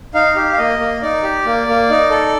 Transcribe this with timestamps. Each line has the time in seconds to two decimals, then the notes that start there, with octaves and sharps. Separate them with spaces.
0.14 D#4 F5
0.36 G4
0.53 F5
0.58 A#3 D#5
0.79 A#3
1.02 D#4 D5
1.23 G4
1.45 A#3
1.68 A#3
1.90 D#4
2.10 A4